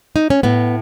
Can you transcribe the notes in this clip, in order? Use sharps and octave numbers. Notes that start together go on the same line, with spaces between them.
D#4
C#4
A2 B3